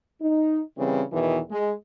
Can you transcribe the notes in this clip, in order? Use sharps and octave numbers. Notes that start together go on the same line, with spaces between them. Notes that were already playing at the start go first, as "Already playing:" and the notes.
D#4
C#3 E3 G3 C4
E2 B2 D#3 E3
G#3